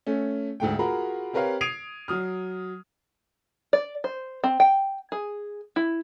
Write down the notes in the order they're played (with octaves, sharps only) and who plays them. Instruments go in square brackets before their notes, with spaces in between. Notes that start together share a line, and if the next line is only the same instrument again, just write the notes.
[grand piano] A3 C#4
D2 G#2 A3 G5
F4 F#4 G#4 A#4 A#5 B5
C4 G4 A#4 B4 C#5 F5
D#6 G#6 C7 D7 D#7 F7
F#3 D#6 F6
[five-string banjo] D5
C5
C4
G5
G#4
E4